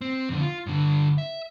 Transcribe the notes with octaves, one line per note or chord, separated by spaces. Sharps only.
C4
F2 D3
F4
G2 D3
E5